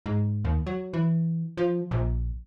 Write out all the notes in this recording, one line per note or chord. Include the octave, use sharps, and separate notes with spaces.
G#2
D#2
F#3
E3
F3
A#1